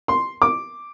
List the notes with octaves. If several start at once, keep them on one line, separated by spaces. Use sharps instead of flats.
C6
D6